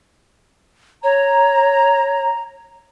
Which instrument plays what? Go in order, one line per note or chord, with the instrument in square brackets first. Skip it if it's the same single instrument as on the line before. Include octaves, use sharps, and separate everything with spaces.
[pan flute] C#5 [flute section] A#5